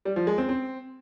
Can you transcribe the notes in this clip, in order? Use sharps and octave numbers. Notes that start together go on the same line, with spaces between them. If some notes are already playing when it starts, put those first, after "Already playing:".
G3
F3
G#3
C4
C4